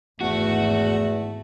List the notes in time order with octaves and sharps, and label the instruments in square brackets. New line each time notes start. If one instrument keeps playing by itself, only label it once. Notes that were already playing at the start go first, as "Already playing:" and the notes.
[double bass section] G#1 [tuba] E2 [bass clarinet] A3 [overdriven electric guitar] F#4